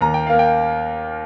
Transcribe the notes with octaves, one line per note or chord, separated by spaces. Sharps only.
D#2 A#5
G5
A#3 F5
G5